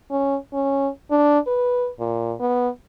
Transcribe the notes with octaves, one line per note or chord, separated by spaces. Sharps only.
C#4
C#4
D4
B4
A#2
B3